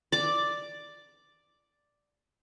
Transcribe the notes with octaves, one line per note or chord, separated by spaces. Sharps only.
D5 D6